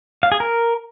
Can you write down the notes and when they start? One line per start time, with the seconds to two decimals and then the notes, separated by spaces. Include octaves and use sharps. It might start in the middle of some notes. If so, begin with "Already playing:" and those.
0.23 F5
0.32 G#4
0.40 A#4